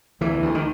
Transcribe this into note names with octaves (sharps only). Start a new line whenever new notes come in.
D2 E3
D2
D#3